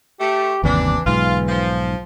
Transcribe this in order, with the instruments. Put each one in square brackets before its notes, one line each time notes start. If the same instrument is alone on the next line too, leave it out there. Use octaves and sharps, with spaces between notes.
[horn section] A3 [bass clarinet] G4
[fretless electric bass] G1 D#2 C3 [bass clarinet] E3 [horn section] D4
[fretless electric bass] B1 G#2 [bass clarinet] E3 [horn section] F4
[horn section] F3